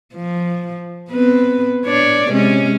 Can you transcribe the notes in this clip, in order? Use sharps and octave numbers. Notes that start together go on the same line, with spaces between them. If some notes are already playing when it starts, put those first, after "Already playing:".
F3
B3 C4 B4
D4 C#5 D5
C3 G#3 C#4